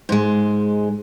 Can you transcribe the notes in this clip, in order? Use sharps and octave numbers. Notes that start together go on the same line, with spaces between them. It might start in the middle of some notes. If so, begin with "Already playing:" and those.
G#2 G#3